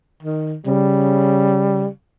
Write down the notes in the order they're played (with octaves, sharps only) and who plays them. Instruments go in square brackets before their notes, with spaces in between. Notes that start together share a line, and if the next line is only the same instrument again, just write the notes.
[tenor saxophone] D#3
[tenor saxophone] C#3 [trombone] G3